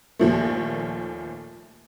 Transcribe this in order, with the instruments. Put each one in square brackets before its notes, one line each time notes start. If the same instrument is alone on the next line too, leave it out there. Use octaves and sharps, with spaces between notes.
[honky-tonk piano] D#2 A#2 F3 A3